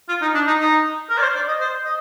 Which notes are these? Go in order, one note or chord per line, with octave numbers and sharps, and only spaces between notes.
F4
D#4
D4
D#4
D#4
A#4
D5
C5
D5
D#5
C5
D#5